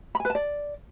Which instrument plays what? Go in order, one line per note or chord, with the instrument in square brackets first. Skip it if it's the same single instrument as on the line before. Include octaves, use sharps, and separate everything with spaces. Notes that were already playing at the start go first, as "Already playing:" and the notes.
[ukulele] B5
G#5
B4
A5
D5